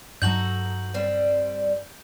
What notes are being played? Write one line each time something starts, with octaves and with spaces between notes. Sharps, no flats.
G2 F#3 D#4 F#4 A4 G6 F#7
G3 C4